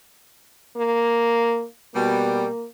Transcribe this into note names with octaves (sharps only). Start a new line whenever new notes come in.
A#3
B2 G3 A#3